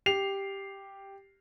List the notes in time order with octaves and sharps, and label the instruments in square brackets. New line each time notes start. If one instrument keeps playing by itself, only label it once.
[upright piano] G4 C7 F7